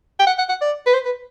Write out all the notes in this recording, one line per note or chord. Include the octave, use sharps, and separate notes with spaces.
G5
F#5
F#5
F#5
D5
B4
C5
B4